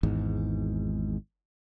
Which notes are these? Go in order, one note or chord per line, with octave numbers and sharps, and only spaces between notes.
G#1 E2 G#2